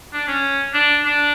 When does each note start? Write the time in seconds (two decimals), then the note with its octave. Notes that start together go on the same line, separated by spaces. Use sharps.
0.13 D4
0.28 C#4
0.74 D4
1.05 D4